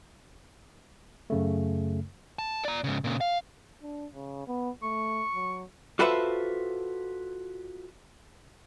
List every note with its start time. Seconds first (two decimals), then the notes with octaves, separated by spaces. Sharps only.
1.30 F#2 C#3 A3
2.39 A5
2.64 D5 A#5
2.84 G#2 C#3
3.04 A#2 C#3
3.21 F5
3.82 D4
4.14 C#3
4.48 B3
4.83 A3 C#6
5.34 F#3
5.99 F4 F#4 A4 B4 C5 E5